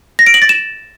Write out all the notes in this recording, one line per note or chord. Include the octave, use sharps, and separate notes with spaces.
A#6
D7
F#7
A6
E7